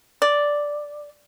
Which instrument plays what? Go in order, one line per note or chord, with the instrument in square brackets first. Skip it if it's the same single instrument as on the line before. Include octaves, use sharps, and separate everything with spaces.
[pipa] D5